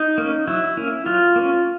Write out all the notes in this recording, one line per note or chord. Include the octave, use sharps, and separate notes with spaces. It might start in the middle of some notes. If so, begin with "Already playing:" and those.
Already playing: D#4
A#3 C#4
F#3 E4
A#3 C#4
F#3 F4
A#3 C#4